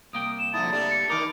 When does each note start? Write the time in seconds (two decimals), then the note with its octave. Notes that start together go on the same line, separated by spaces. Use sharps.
0.13 C2 A#3 G5 D#6
0.39 E7
0.54 F2 D3 E4 A5 D#6
0.72 G3 A3 D4
0.91 C#7
1.10 D#3 D#4 A#4 D6